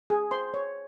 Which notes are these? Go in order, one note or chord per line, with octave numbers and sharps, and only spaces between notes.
G#4 G#5
C5 C6
C#5 C#6